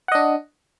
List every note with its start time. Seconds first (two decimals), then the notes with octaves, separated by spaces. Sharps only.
0.08 F#5
0.12 D#5
0.15 D4